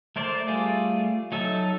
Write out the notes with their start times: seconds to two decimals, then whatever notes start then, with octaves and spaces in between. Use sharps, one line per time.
0.16 A3 A#4 C5 D5
0.48 G3 A3 F4 G#4
1.32 F#3 D#4 A4 E5